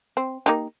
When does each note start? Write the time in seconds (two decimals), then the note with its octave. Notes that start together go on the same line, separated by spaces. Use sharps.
0.17 C4
0.46 A#3 D#4 G4